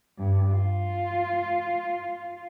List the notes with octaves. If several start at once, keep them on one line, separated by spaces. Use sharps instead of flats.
G2
F4